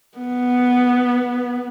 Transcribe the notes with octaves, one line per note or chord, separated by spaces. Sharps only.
B3